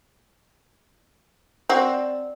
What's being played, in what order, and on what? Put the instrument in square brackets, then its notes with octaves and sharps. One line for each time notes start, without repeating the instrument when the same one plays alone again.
[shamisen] C4 F#4 [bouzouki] D4